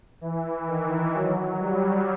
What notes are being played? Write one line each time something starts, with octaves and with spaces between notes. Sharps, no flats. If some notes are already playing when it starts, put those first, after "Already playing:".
E3
D#3
F#3
G3